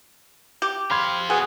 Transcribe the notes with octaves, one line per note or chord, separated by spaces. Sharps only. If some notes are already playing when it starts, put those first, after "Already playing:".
G4
C4 F5 B5 C6 G#6
B2 G#4 F#5 G#5